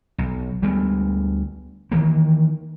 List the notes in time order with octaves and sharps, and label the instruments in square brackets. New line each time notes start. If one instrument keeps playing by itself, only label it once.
[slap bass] B1
D2 G3 G#3 B3
D#3 E3 A#3